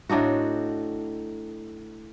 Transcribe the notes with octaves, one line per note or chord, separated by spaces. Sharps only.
A2 D4 D#4 F#4